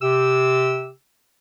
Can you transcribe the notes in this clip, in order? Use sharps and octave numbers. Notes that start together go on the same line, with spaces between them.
C3 G4 E6